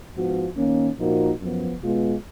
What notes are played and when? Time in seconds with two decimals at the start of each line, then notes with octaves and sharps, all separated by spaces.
0.15 G#2 F3 B3 F#4
0.56 D#3 A#3 C#4
0.98 A#2 F3 A#3 D#4 F#4
1.40 F#2 F3 B3
1.81 B2 G#3 B3 F4